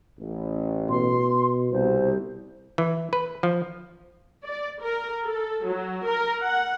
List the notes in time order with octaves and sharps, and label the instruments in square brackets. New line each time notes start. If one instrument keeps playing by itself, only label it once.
[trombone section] A1
[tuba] B2 [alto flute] C6
[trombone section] C2 [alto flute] C5
[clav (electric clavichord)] E3
B4
F3
[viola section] D5
A#4
A4
F#3
A#4
F#5